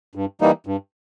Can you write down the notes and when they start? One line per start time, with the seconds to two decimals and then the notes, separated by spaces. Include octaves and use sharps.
0.15 G2
0.41 E3 G3 A#3 D#4
0.67 G2